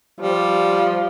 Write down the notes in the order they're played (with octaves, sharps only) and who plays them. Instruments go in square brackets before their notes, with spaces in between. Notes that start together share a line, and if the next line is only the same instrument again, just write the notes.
[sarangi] F3 [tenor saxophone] G3